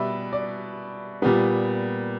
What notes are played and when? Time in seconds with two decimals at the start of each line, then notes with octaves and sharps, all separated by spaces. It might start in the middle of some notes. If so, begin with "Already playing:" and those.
Already playing: B2 G3 B4 D5 E5
0.33 D5
1.22 A#2 G3 B3